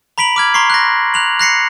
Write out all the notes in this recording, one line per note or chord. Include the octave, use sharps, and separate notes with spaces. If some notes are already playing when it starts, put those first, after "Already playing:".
A#5 B5 B6 D7 F#7
D6 F6 G#6
A#5 C6 C#6 C7
F#6 A#6
F#6 F7 F#7
F#6 A#6 C7 C#7